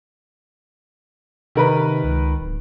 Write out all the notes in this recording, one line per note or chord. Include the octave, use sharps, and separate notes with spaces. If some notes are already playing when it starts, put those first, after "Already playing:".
C3 D#3 A#4 B4
C#2
D1